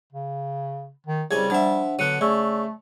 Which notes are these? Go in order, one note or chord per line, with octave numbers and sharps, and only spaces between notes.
C#3
D#3
C2 C#3 G3 G#5 G#6
F3 D4 E5 F#5
D3 F#3 B3 F#6 C#7 D#7
C#3 A3 D5 C#6 E6